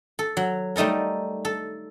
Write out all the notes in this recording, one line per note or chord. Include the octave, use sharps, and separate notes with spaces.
A4
F#3
G3 A3 D#4 A4 A#4
A4